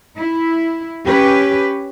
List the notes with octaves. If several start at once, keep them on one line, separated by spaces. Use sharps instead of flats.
E4
C#4 G4 B4